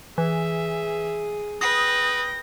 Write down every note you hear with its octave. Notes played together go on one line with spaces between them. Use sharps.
E3 G#4 E5
B4 G5 D#6 A#6